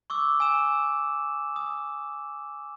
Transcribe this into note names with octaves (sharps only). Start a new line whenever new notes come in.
C#6 D6 E6
G#5 E6 E7
D#6